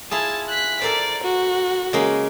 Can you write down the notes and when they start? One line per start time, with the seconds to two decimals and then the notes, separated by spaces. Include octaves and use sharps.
0.11 E4 F4 G#4 A5
0.49 F#6 B6
0.81 A4 A#4 C5 D5
1.23 F#4
1.93 C#3 G#3 A#3